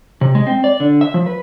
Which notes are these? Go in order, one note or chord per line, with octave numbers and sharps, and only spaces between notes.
C3
G#3
C4
D5
D3
E5
F3
B4